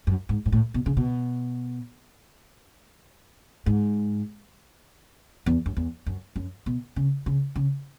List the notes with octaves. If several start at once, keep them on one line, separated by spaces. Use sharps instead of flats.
F#2
G#2
G#2
A2
B2
C#3
B2
G#2
E2
F#2
E2
F#2
F#2
B2
C#3
C#3
C#3